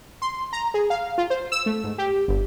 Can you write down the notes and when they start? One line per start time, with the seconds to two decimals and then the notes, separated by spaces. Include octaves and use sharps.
0.22 C6
0.53 A#5
0.74 G#4
0.90 F5
1.18 F4
1.30 C5
1.52 E6
1.66 A3
1.84 G#2
1.98 G4
2.28 G1